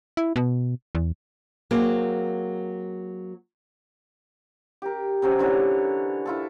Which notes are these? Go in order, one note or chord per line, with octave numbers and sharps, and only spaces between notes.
E4
B2
E2
F#3 A#3 C4 G#4
G4 A#4
C3 F#3 C#4
D3 E3 C#5
E4 F4 A4